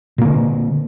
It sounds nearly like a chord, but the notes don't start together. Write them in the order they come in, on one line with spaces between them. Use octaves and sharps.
A#2 A#3 D3